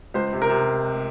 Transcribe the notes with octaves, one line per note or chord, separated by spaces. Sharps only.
C#2 C5
C3
A#4
C3